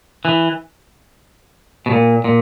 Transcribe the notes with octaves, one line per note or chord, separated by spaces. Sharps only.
E3
B2
A#2
A#2